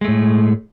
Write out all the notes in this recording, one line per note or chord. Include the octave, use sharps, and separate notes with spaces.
A2 G#3 A3